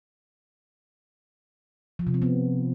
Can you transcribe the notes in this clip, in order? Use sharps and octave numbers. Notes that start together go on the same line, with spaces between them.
F3
C3
C4
B3